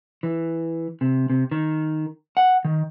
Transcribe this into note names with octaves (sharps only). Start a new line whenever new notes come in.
E3
C3
C3
D#3
F#5
D#3